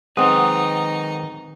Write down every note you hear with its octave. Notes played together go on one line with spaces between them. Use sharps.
D#3 G#3 C4 D#4 B4 F#5 A#5 D#6